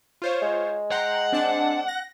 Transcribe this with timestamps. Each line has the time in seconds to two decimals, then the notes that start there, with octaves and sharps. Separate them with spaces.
0.22 F4 C5 C#5
0.42 G#3
0.91 F#5 G5 A#5 C6
1.32 C4 D4 A5
1.88 A#6